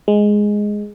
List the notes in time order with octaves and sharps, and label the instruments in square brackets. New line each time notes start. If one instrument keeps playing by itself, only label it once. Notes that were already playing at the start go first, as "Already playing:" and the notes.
[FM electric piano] G#3